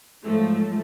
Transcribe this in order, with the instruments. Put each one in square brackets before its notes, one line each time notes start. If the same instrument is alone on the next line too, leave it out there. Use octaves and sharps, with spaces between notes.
[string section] G#2 F3 F#3 A3